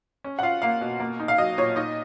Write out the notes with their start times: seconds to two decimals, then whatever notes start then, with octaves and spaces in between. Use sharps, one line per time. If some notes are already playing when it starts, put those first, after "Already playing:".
0.24 C#4
0.39 F#5
0.43 F4 F5
0.62 A#3 F5
0.81 B2
1.00 A#3
1.20 D#4
1.28 F5
1.38 F#3 D#5
1.58 A#2 C#5
1.76 D#4 D#5